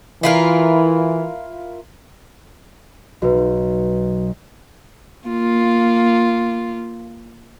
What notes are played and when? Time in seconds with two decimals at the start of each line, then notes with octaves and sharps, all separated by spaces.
0.23 E3 E4 F4 A#4
3.22 B1 F#4 B4
5.27 A#3 F4